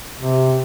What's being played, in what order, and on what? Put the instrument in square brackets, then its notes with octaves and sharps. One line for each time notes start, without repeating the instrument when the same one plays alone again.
[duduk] C3